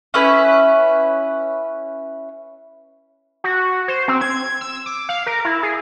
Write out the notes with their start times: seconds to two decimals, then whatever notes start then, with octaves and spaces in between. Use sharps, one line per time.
0.14 C#4 E4 B4
3.44 F#4
3.88 C5
4.08 C4
4.21 G#6
4.61 E6
4.86 D6
5.09 F5
5.26 A#4
5.45 E4
5.63 G#4